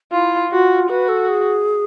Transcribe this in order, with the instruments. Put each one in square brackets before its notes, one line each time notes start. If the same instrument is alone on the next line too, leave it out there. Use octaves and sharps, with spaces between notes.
[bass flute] E4 [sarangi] F4
[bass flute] F4 [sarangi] F#4
[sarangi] F#4 [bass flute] B4
[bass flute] A4
G#4